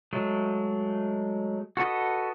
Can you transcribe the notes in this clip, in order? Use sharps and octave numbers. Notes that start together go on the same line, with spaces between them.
F#3 G#3 A3
F#4 A4 B4 D#5